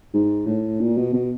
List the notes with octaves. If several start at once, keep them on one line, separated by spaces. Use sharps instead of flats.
G#2
A2
A#2
B2
B2